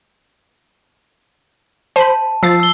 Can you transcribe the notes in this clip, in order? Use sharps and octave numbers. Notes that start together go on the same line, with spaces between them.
C5 A5 B5
F3 E6 A6 C7
E6 G7